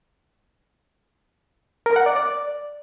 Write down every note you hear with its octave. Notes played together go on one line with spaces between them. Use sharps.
A#4
F#5
D5
D5